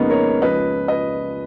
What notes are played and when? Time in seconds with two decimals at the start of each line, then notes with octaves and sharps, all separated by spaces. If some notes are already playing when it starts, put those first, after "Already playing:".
Already playing: F2 C#3 G#3 A#3 B3 C#4 D#4
0.10 A#4 C#5
0.42 C#2 C#3 F3 B4 D#5
0.88 B4 D#5